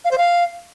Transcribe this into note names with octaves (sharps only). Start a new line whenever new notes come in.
F5
C5
F5